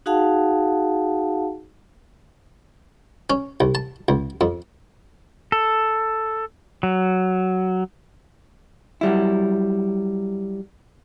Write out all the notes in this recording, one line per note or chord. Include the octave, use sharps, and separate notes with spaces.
D#4 F#4 G#4 F5 F#5 A5
C#4
C2
A5
C#2
F2
A4
F#3
F#3 G3 E4